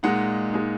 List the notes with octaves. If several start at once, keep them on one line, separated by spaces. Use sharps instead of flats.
A#2 G#3 D#4 F#5
A#2 G#3 D#4